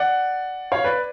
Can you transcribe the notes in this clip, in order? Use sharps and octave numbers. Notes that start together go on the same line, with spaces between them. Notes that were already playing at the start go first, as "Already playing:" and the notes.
Already playing: D5 F#5
C#5 F5
B4 D5